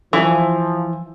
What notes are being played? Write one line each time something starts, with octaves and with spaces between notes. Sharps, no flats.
E3 F3